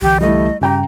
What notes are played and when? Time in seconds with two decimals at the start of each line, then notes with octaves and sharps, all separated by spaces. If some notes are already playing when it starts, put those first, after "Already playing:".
0.02 C2 D3 E3 G4
0.21 G3 A3 E4 D#5
0.61 G2 C#3 G4 G5 A#5